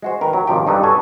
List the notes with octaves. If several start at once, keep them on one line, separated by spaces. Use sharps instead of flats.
G#3 F#4 C5
D#3 A#4 B4
F#3
G#1 D#3 F3 G4 G5
G2 D#4 G4 A4 B4
F#4 A4 B4 C#5 G#5